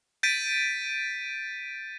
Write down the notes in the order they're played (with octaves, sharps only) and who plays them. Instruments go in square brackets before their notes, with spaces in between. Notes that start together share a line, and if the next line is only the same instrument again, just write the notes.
[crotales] G6 A6 B6 D7 D#7